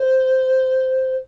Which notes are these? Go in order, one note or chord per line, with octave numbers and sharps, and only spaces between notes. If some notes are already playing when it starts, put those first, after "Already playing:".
Already playing: C5